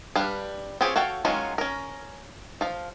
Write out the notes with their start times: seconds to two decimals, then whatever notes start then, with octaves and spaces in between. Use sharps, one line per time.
0.16 G3 D4 B4 F5
0.81 C4 F4 G4 G#4 C#5
0.96 F#4 A4 C#5 F5 G5
1.25 D#3 F#3 G#3 C#4 F4
1.58 C#4 A#4
2.61 F3 F5